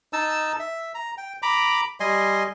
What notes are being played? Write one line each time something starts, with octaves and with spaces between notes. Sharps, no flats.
D#4 A5 E6
E5
A#5
G5
A#5 B5 D6
G3 D#5 G#5 C6